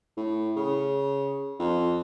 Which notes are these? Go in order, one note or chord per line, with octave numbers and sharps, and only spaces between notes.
A2
C#3
F2